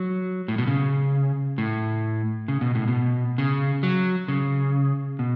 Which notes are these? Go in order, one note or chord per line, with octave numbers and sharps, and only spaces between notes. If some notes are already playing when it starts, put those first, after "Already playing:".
Already playing: F#3
A2
B2
C#3
A2
C#3
B2
A2
B2
C#3
F#3
C#3
B2